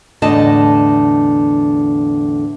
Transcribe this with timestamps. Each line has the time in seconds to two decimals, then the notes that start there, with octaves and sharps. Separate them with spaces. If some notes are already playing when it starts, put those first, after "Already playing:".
0.22 E2 A2 D3 D#5 A5